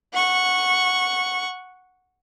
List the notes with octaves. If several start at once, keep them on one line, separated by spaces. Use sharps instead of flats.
F#5 C#6